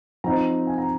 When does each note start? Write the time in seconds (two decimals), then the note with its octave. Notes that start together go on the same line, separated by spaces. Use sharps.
0.24 F3 C4 D#4 A#5
0.67 G#5
0.78 A#5